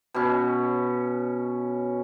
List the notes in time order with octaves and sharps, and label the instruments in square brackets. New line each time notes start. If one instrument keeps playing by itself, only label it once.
[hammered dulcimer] B2 C#4